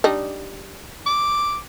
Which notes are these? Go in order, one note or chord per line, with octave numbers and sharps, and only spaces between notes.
G3 D4 D#4
D6